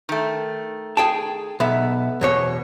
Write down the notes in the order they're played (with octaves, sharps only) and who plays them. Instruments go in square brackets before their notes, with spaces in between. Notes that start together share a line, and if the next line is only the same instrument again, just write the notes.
[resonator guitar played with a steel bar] D#3 A3
[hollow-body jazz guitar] G#4 G5 A5
[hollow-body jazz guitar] B1 [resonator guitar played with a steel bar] B3 E5
[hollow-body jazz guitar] E2 B2 C#5